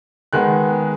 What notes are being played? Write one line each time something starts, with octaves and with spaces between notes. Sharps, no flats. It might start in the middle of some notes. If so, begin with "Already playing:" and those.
D#3 G#3 B3 F#6